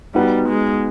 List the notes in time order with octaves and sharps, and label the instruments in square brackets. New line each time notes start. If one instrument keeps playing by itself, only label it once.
[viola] G3 [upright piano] B3 D#4 F#4 B4
[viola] G#3